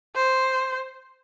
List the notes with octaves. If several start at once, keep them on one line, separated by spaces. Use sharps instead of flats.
C5